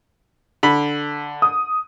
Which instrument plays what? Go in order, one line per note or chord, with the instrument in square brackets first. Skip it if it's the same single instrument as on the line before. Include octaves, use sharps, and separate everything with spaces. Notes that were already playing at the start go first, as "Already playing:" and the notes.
[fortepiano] D3 B5
[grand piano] D#6